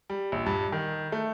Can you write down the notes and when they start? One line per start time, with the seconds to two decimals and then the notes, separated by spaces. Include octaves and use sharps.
0.10 G3
0.32 A#1
0.46 G2
0.72 D#3
1.12 A3